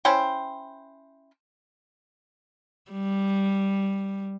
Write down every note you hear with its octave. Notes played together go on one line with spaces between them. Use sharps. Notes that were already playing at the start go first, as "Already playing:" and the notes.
C#4 E4 C5 G5
G3